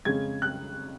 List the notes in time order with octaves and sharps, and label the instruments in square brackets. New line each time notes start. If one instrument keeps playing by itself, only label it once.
[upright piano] F2 C#3 G#3 C#4 G#6
F#6